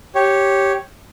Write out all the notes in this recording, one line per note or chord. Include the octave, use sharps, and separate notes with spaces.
G4 C#5